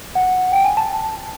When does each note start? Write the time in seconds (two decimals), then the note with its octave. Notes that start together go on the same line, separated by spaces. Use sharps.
0.15 F#5
0.52 G5
0.64 G#5
0.77 A5